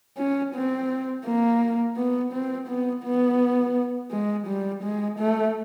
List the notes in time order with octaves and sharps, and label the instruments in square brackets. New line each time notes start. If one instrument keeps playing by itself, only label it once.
[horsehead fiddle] C#4
C4
A#3
B3
C4
B3
B3
G#3
G3
G#3
A3